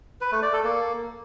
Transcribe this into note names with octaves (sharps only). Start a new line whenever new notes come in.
B4
A3
D5
A4
A#3